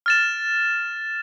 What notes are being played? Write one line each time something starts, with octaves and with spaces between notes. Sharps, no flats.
F6 A6 E7